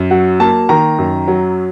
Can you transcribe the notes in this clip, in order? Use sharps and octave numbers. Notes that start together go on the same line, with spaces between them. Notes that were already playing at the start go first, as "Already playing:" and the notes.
Already playing: F#2
F#3 F#5
A#3 A5
D#3 A#5
F#2
F#3